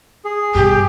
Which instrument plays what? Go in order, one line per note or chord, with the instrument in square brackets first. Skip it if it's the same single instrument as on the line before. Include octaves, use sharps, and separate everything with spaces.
[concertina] G#4
[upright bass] G2 B2 [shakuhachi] G4